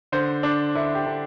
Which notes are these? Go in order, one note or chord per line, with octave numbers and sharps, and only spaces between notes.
D3 C5
D3 D4
D3 E4
G4
D3